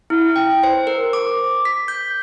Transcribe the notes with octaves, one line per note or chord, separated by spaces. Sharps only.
E4
G5
C5
A#4
D6
B6
G6